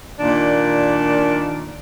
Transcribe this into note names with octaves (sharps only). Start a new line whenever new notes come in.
A#2 D#3 D4